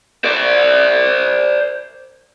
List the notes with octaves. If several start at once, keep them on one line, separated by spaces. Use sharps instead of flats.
C5 D5